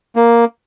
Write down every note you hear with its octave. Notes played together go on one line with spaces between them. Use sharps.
A#3